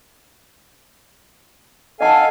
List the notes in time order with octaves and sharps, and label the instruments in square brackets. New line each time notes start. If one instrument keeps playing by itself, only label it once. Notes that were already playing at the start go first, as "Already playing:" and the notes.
[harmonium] A4 F5 G#5 [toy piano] D#5 F#5 A5